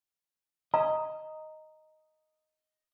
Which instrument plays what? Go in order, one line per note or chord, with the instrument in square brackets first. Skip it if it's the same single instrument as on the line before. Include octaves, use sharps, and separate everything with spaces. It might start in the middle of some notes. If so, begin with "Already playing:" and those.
[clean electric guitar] D#5 [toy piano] A#5